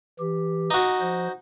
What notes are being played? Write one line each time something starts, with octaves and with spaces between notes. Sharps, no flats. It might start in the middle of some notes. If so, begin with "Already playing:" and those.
E3 G4
D#4 F#4
F3 C5